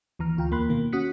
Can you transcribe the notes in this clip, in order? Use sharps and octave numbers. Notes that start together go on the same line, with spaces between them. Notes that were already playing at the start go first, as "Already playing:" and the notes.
D#2 E3 A#5 F6
D2 F4 G5 A#5
E2 A#3 B5 C6 F#6
B2 D#3 A#3
C#4 F#4 D#6 F#6 B6 C#7